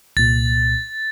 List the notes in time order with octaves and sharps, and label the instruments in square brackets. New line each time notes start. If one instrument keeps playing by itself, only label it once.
[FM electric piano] C2 A#2 [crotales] A6